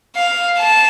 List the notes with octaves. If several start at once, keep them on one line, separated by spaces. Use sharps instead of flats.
F5
A5